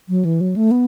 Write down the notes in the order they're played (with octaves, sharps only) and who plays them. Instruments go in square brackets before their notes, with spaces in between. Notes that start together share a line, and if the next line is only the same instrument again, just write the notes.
[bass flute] F#3
E3
F#3
A3
B3